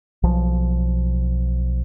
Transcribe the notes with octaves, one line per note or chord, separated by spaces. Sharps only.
B1 F3